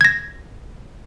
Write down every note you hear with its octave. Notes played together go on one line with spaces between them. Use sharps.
G#6 A#6